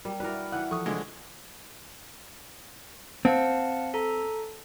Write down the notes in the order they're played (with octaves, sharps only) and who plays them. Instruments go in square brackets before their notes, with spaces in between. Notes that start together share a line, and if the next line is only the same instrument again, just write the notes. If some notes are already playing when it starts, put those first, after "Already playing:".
[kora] G3 [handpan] A#4
[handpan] E4 F#4 D5 [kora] A#4 B4
[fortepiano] E3 F#6 [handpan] F#5
[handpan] E3 F3 A4 [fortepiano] C#6 D#6
[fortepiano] C2 D3 G#3
[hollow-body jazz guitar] C4 [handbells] F5 F#5 A5
[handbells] A4 A#5